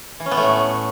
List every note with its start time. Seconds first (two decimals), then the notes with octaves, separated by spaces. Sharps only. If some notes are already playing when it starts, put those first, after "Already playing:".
0.20 E3
0.26 C#4
0.31 B3
0.37 A3
0.43 A2